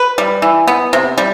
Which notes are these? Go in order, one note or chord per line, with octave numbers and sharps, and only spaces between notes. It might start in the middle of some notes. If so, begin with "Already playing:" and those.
Already playing: B4
G3
E3
B3
C3
G3